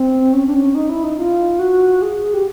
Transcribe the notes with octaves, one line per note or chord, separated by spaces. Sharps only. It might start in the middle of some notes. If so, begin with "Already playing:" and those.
Already playing: C4
C#4
D4
C#4
D#4
E4
D#4
F4
F#4
G#4
G4